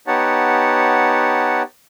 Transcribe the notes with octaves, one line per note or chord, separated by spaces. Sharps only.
B3 D#4 G4 C#5 F#5 A5